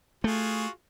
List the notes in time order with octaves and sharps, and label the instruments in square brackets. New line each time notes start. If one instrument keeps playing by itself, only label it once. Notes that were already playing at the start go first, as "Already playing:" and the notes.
[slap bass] A3 [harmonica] F4 F#4 G#4